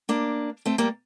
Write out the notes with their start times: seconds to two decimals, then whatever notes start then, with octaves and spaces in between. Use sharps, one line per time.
0.09 A#3 D4
0.66 A3 C4
0.78 G3 A#3